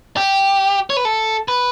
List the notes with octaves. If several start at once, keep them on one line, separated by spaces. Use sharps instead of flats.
G4
C#5
B4
A4
B4